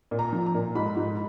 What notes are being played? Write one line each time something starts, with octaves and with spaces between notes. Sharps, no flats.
A#2
A#5
F3
A#5
A#2
G#2 B5
G#2